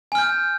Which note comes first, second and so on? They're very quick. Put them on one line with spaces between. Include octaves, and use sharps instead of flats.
G#5 F6 G6